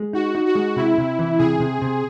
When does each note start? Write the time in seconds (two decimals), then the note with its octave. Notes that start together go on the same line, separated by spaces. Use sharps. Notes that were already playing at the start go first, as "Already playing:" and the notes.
Already playing: G#3
0.13 D#4 F#4
0.35 D#4
0.46 F#4
0.55 G#3
0.76 C3 E4
0.98 C3
1.19 E3
1.39 C3 G#4
1.60 C3
1.82 C3